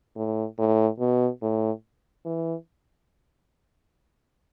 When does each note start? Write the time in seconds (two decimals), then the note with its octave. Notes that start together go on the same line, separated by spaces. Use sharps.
0.16 A2
0.59 A2
0.99 B2
1.42 A2
2.25 E3